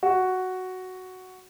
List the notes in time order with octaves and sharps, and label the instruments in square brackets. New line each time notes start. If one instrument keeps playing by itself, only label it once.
[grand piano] F#4